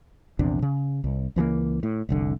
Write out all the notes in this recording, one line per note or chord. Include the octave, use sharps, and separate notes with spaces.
A#1 E2 C3 D4
C#3
C2
C#2 E3 F#3 A#3
A2
F1 C2 D3